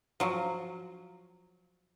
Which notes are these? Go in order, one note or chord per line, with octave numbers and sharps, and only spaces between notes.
F3 F#3